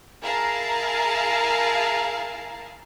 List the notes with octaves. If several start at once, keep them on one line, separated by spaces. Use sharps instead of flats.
E4 G#4 A#4 F5 A5 A#5